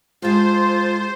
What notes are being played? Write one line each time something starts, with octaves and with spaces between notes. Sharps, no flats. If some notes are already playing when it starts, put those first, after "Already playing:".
A2 G#3 F4 C5